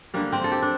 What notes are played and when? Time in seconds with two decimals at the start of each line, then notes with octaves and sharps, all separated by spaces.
0.14 D3 G3 A#3
0.32 C4
0.44 A4
0.52 G4
0.62 D4